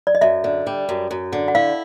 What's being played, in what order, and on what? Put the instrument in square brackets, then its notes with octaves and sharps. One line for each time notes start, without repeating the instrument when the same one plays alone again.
[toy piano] D5
D#5
[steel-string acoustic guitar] F#2 [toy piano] E5
[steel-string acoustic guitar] D3
G3
F#2
F#2
D3
[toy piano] F#5
[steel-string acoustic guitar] E4 [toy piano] F5